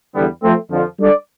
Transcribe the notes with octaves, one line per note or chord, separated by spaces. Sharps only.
E2 D3 G3 B3
F3 A3 C4
F2 D3 F3
G3 D4 A4 D5